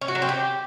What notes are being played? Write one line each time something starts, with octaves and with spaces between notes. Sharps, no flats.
C#4
F#4
F#3
C4
G4